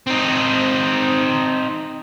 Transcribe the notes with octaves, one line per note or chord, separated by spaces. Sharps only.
C4 D#4